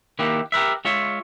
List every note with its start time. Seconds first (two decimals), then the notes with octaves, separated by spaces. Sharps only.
0.19 D#3 A#3 E4 G4 B4
0.52 G4 A#4 B4 E5
0.85 G#3 F4 C#5 E5